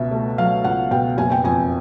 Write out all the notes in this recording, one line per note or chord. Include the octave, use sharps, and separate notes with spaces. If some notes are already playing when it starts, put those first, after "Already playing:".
Already playing: C#2 B2 E5
A3
F#3 F5
C#2 F#5
B2 G5
F#1 G#5
G5
F2 G#5